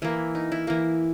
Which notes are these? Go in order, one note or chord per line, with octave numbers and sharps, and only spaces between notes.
E3 A#3 E4
D#4
E4
E3 A#3